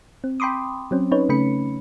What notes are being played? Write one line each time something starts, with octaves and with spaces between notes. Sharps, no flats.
C4
G5 B5 C6 D6 D#6
F#3 C4 C#4
C#4 D#4 B4 C#5
C#3 A3 C#4 B5 C#7